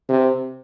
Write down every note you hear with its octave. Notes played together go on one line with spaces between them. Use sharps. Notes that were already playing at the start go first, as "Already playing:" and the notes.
C3